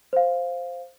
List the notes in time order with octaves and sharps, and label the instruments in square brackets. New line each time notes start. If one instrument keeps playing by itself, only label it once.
[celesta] C5 F5